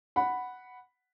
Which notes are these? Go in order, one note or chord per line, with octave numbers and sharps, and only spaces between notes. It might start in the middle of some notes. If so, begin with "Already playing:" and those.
F#5 B5